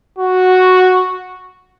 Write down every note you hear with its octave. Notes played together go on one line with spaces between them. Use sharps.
F#4